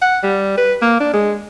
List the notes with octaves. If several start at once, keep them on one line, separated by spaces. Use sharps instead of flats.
F#5
G3
B4
A#3
D4
G#3